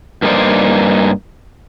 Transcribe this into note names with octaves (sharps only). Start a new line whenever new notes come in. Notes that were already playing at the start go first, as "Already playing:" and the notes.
G2 A#3 D#4 G4 C5 D5